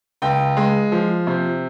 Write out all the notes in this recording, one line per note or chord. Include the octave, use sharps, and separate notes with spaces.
C#2 G5
G#3
F3
C3